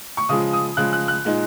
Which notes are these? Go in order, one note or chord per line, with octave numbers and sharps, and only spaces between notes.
C#6
C#3 F3 G#3 D#6
D#6
C#3 F3 G#3 F#6
F#6
F#6
A#2 G#3 D#4